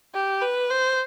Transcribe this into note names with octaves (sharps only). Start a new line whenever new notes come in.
G4
B4
C5